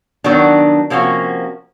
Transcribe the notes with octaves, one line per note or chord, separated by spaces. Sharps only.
D#3 F#3 B3 D4
C3 F3 A#3 C#4 F#4